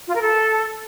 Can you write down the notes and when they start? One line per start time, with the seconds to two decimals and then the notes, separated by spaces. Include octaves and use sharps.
0.07 F4
0.14 A#4
0.21 A4